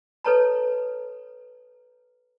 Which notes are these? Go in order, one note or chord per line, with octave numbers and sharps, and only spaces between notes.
A4 B4 C#5 A5 A#5